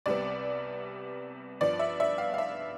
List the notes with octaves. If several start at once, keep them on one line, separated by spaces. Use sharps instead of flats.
C2 C3 G3 B3 D5
G2 F3 B3 D5
E5
E5
F5
F5
E5